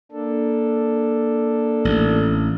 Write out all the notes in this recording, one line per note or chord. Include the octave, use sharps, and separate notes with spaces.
A#3 D4 A4
A1